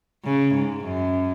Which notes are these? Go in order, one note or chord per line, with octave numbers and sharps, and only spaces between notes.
C#3
G#2
F#2